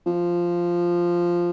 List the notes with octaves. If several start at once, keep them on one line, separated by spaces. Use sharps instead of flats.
F3